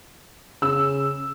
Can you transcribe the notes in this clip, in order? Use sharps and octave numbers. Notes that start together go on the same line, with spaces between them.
C#3 E6